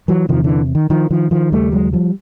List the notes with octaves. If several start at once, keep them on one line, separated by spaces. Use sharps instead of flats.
E3 F#3
E2 C3 D#3 F3
D3 E3
D#3
D#3 F3
D#3 F3
D#3 F3
D#2 C#3 G3 A3
F#3 G#3
F3 G3